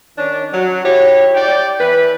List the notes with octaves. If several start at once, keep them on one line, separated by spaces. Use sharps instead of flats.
D#3 C#4 D4
F#3
E4 G4 C#5
D5 G5
E3 B4